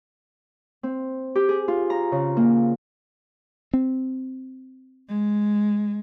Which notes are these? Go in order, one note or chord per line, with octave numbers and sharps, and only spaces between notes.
C4
G4
G#4
F4
A#5
C#3
A#3
C4
G#3